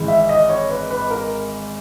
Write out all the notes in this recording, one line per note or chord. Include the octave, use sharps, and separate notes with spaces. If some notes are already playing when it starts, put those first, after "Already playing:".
Already playing: G#1 G#2 E3 G#3
E5
D#5
C#5
B4
B4
A#4